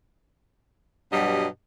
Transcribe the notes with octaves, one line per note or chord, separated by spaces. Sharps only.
G2 B2 F#3 G3 D#5